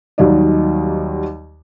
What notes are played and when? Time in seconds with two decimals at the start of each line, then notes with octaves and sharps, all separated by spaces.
0.18 D#2 D#3 F#3 G3 D5 D#5